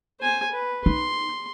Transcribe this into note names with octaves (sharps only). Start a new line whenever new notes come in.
C5 G#5
B4
D#4 C6